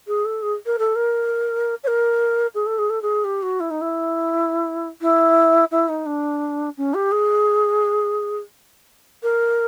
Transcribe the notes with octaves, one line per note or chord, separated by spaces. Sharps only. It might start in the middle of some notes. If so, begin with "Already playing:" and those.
G#4
A4
G#4
A#4
A4
A#4
C#5
A#4
G#4
A4
G#4
A4
G#4
G4
F#4
E4
D#4
E4
E4
E4
D#4
D4
C#4
G4
G#4
A#4